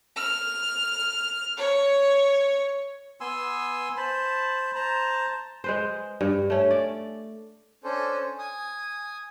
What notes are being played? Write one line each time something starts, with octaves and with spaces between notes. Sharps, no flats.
F6
C#5
B3 G#5 C6 E6
C5 A5 B5
C5 A5 A#5
G#3 B4 C5
G2
A3 C#4
D5
C#4 D4 A4 C5
G#5 D#6